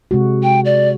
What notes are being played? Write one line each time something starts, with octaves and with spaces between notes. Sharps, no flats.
C3 G#3 F#4
G5
D5